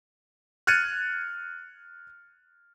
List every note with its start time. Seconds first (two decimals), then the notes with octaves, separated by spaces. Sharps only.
0.67 F6 F#6 G#6 A6 C#7 D#7